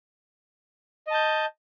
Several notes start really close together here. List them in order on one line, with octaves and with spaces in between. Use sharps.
D#5 A5 G6